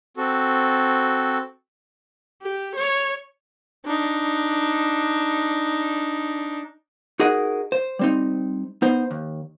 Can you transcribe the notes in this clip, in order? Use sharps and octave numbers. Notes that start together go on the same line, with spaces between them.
C4 F#4 A4
G4
C#5
D4 D#4
D#4 F#4 G#4 A#4 D#5 F#5
C5
G3 C4 D#4
B3 D#4 C5
D#2